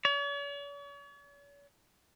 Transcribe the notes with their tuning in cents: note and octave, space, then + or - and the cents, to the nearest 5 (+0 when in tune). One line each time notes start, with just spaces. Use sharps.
C#5 +45